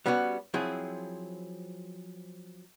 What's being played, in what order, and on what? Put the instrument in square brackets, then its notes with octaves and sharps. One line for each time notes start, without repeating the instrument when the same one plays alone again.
[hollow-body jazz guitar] G3 B3 C#4 F#4
F3 F#3 C4 E4 G#4